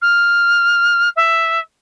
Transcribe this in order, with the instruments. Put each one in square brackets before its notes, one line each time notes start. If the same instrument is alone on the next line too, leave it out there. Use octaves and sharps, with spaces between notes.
[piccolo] F6
E5